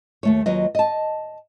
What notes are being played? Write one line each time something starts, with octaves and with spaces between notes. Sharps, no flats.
D#2 A3 C#5
D#2 F#3 F4 B4 D#5
D#5 A5